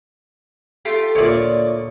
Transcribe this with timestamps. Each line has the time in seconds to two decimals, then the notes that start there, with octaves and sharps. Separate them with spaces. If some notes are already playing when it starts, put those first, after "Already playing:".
0.85 A3 F4 G4
1.15 D2 A#2 C#5 D5